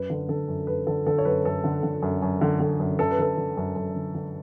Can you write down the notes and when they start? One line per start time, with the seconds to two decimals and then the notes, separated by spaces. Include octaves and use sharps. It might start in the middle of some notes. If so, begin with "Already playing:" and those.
Already playing: F#2 B4
0.10 D3
0.29 D3 A4
0.48 F#2
0.67 F#2 B4
0.87 D3 A4
1.06 D3 A4
1.18 C#5
1.25 F#2 B4
1.45 F#2 A4
1.64 D3
1.83 D3
2.02 F#2
2.22 F#2
2.41 D3
2.60 D3
2.80 F#2
2.99 F#2 A4
3.11 B4
3.18 D3 A4
3.37 D3
3.57 F#2
3.76 F#2
3.95 D3
4.15 D3